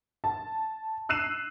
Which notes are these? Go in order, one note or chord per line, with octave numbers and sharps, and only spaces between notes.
A5
E6 F#6 C7 D#7 E7